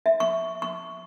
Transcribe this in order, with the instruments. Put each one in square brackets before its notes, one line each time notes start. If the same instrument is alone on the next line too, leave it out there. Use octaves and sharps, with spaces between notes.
[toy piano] E5
C#6
C#6